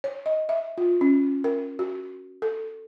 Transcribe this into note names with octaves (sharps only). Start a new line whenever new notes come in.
C#5
D#5
E5
F4
C#4
A#4
F#4
A4